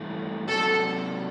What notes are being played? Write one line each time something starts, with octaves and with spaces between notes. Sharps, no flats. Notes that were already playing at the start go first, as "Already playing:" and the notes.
Already playing: G2 E3 A3
C3 F#3 C4 F#4 A4